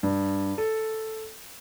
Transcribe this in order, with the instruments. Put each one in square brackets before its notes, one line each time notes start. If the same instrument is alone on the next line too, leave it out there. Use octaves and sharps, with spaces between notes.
[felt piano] G2
A4